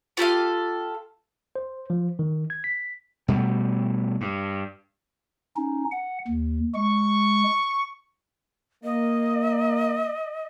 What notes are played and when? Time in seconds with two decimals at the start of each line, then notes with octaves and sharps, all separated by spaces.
0.17 F4 G4 A4 F5
1.56 C5
1.90 F3
2.19 D#3
2.50 G#6
2.64 B6
3.28 B2 G3 A3
4.21 G2
5.56 C#4 D#4
5.92 F#5
6.28 D#2
6.75 G#3 C#6
8.84 A#3 D#5